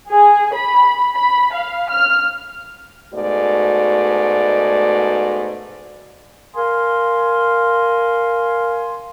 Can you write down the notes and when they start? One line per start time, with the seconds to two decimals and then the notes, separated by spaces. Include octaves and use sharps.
0.10 G#4
0.54 B5
1.13 B5
1.54 F5
1.90 F6
3.14 G#2 B2 A3 F#4 D5
6.56 A#4 F5 G#5 C6